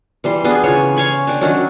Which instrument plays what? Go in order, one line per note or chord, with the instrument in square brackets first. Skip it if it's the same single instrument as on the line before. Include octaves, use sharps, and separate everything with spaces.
[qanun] E3 G3 C6
B3 D4 G#4 C6
C#3 E3 F4 C#5
C#5 F5 G#5 B5
D4 G5
D#3 F#3 C#4 D4